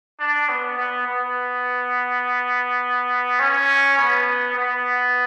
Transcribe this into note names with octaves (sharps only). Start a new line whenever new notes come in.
D4
B3
B3
B3
C#4
B3
B3